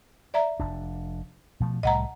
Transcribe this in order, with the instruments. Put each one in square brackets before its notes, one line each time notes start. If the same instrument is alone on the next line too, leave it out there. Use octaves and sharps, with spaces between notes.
[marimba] D5 E5 A#5
[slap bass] F1 D4
B2 F3 A3
[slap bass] C2 A2 G3 [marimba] D#5 F#5 A#5